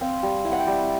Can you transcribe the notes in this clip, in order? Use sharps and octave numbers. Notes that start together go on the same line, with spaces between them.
C4 F5
G3
E4
F#5
G5
G3